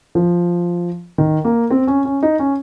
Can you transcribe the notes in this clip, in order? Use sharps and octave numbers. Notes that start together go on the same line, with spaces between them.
F3
D#3
A#3
C4
C#4
C#4
D#4
C#4